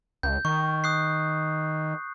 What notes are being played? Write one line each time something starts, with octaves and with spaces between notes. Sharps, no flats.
C#2 G6
D#3 C#6
D#6 F#6 C7